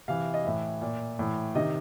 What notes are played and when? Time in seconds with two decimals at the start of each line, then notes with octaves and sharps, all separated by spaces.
0.08 C3 E3 F5
0.34 D#5
0.44 A2 E3 E5
0.82 A#2
1.19 A2 E3
1.55 C3 D#3 D#5